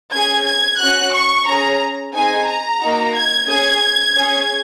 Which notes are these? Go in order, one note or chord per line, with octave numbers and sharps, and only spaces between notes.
C#4 G#4 G#6
G#6
C#4 F#4 F#6
C#6
C#4 G#4 A#5
C4 D#4 G#4 G#5
A#5
A#3 D#4 F#4
G#6
C#4 G#4 G#6
C#4 G#4